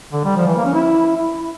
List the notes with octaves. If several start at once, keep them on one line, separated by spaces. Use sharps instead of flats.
D3
G3
F3
E3
A#3
C#4
E4
E4